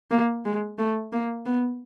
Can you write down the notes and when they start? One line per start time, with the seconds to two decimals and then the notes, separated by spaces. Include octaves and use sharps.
0.11 A#3
0.45 G#3
0.78 A3
1.12 A#3
1.46 B3